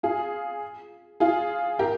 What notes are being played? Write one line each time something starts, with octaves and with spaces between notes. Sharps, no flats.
F4 G#4
F4 G#4
G4 A#4